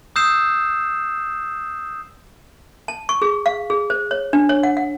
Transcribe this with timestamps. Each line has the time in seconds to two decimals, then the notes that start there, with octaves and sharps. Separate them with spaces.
0.16 D#6 E6 G6 C7 E7
2.88 A5
3.09 C#6
3.22 G#4
3.46 F5
3.70 G#4
3.90 C5
4.11 C#5
4.33 D4
4.49 C#5
4.63 F#5
4.77 F#5